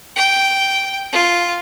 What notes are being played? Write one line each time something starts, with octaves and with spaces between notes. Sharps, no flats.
G5
F4